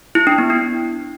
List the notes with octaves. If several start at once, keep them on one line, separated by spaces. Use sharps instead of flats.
E4
D4
B3
D4